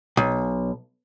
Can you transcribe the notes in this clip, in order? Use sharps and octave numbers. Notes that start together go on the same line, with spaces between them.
B1